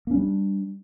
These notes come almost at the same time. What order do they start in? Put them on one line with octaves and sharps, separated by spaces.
A#3 C#4 G3 D4